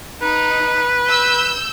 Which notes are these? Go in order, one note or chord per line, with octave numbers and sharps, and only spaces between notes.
D#4 B4
E6 G6